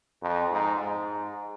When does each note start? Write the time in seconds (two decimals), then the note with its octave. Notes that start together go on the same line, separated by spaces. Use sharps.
0.22 F2
0.53 G#2
0.83 G#2